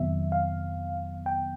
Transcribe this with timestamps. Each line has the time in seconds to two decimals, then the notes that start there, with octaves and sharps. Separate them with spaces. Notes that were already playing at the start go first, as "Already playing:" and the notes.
Already playing: F2 C3 D#3 F#3 B3 E5
0.32 F5
1.26 G5